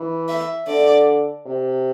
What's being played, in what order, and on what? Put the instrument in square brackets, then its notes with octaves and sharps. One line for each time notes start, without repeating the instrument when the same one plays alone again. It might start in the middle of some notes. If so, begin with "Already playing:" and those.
Already playing: [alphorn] E3
[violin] E5
[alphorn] D3 [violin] D5
[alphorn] C3